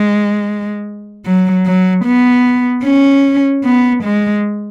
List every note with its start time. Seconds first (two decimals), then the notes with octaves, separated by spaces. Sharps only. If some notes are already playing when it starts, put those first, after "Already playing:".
Already playing: G#3
1.26 F#3
1.66 F#3
2.05 B3
2.84 C#4
3.64 B3
4.04 G#3